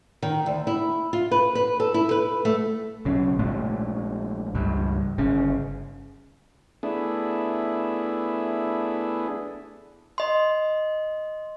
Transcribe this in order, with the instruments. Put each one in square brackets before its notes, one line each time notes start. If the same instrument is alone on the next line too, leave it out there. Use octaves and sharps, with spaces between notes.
[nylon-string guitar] D#3
D2
E4
F4
B4
B4
A4
E4
B4
A3
[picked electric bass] B1 C#3
A#1 A#2 G#3 A3
C#2 G2
G1 C#3
[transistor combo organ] A3 B3 D4 E4 G#4
[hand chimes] D#5 C6